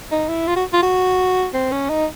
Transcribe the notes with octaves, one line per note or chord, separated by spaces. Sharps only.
D#4
E4
F4
F#4
F4
F#4
C4
C#4
D#4